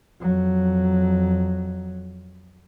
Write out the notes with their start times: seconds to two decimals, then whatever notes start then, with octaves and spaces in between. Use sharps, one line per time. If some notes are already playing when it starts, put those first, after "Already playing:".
0.21 F2 F#3